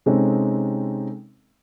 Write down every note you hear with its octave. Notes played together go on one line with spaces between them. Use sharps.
C3 G#3 C4 C#4 D#4 A4